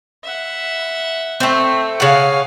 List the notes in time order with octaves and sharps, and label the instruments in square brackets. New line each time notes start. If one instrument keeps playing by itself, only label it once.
[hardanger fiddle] E5 F#5
[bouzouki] A3 C4
[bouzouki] C#3 F#5 [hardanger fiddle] F5 G#5